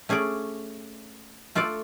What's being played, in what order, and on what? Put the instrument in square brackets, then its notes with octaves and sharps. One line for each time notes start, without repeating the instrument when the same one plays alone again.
[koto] A3 C#4 G#4 D5
A3 F4 A4 D5